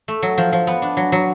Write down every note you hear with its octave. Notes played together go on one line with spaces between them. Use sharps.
A3
F#3
F3
F3
B3
D4
F#3
F#3